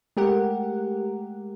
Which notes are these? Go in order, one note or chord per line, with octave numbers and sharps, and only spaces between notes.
G#3 A3 G4 A#4 F#5